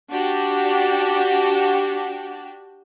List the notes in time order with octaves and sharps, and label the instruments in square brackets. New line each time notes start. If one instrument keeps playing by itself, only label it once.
[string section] D4 F#4 G4